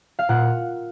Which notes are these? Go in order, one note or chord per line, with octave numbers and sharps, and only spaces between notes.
F5
A#2 F#5